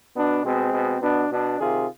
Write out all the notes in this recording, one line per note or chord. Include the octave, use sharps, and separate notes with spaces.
B2 B3 D4
B2 G#3 C4
B2
B2 B3 D4
B2 B3 D4
C3 D#3 F4 G#4